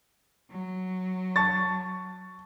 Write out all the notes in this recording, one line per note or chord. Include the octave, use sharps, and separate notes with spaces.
F#3
A5 C#6 A6